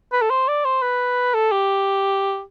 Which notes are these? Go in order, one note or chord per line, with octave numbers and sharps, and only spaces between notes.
B4
A4
C5
D5
C5
B4
A4
G4